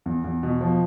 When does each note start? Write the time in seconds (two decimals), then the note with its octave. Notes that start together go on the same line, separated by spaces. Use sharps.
0.06 E2
0.24 E2
0.43 B2
0.61 F3